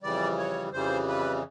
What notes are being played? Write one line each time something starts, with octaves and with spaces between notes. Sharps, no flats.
F2 C#3 E3 G3 D5
C#5
F2 C#3 E3 G3 C5
B4